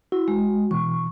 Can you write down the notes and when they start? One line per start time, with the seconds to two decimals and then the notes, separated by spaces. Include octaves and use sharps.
0.12 E4 F#4
0.28 G#3
0.71 B2 E3 C#6